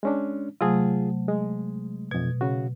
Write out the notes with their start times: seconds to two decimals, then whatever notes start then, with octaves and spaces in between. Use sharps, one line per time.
0.03 G#3 C#4 D4
0.61 C3 F#3 A3 F4 G#4
1.28 G#3
2.11 F2 B2 G#6
2.41 C#3 F#4